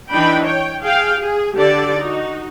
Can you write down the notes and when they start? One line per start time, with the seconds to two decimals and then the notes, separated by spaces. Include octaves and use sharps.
0.11 E3 D4 D#4 G5 B5
0.44 C#5 G5
0.82 G#4 F5 G5
1.19 G#4
1.55 D3 G4 A4 D5
1.98 D#4 F#4